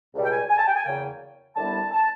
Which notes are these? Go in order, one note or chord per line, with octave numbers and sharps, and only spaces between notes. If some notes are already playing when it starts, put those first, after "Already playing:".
C#2 B2 G3
G5
G#5
G#5
A5
G5
G#5
E2 C#3 F#3 A#3 G5
D#2 D3 G3 B3 E4 A5
A5